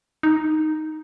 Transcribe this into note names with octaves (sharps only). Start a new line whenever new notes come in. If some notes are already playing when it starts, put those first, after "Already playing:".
D#4